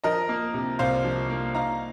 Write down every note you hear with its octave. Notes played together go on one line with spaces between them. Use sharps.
F3 A#4 D#5
A#3
C3
C2 C5 F5
F3
A#3
D#4 F5 A#5